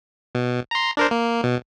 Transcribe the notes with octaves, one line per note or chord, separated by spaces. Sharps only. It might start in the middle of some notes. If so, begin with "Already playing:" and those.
B2
A#5 C6
D4 A#4 C5
A#3
B2